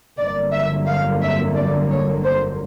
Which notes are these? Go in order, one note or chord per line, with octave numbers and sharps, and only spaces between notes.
G1 F2 D3 F#3 A#3 D5
E5
F5
E5
D5
C#5
C5